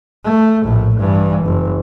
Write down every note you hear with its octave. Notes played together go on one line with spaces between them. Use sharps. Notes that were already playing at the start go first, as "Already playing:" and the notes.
A3
A#1 A2
G2 E3
F#1